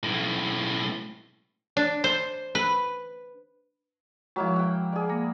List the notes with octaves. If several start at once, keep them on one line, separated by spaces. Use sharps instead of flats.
B1 A2
D4
C5
B4
F3 F#3 G#3 A#3 E4
F#5 G5
G#4 D5
A#3 A#6